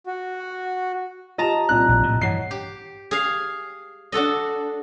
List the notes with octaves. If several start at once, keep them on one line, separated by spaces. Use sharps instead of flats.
F#4
F4 G4 D#5 A5 A#5
C2 A#2 F#6
A#1
A2
G2 E3 C#5 F#5 C7
G4
G#4 F5
D4 F#4 A4 D#5